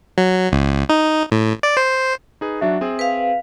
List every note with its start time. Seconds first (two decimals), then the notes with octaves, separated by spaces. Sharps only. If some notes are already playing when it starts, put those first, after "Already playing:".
0.18 F#3
0.52 C#2
0.90 D#4
1.32 A2
1.63 D5
1.77 C5
2.41 D#4 G#4 B4
2.61 F#3 D4 F#4 E5
2.81 C4 G#4
2.99 B4 F5